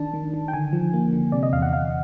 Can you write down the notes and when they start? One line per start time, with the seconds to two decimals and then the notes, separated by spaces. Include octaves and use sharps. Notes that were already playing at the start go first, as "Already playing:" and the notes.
Already playing: D#3 D4 A5
0.14 D#3
0.34 D#3
0.48 G5
0.53 D3 G#5
0.73 F3
0.93 A#3
1.13 D3
1.32 C3 D5
1.43 D#5
1.53 E2 F5
1.62 F#5
1.72 E2 F5